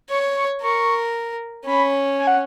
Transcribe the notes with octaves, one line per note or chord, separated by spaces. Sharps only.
C#5 C#6
C#6
A#4 C#6
C#4 B5
G#5
F#5